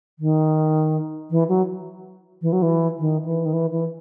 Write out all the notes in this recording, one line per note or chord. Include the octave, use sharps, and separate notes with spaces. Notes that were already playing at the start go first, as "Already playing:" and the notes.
D#3
E3
F#3
E3
F#3
E3
D#3
E3
D#3
E3
E3